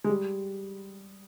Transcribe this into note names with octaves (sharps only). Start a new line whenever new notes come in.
G#3
G3